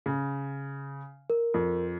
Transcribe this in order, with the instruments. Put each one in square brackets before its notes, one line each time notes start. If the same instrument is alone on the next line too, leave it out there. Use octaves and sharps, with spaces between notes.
[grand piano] C#3
[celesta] A#4
[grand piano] F2